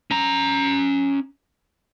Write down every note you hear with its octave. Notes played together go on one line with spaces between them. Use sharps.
C#4 A#5